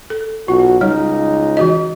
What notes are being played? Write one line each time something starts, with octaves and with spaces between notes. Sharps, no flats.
A4
B1 F4 F#4
C#2 G3 D#4 C#5
E3 F#4 D#5